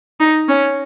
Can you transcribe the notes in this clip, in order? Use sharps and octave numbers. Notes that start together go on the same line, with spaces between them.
D#4
C#4